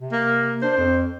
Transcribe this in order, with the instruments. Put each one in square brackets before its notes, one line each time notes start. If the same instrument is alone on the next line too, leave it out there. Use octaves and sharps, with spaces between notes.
[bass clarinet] C3
[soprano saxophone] A#3
[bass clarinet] D4 [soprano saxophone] C5
[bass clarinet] F2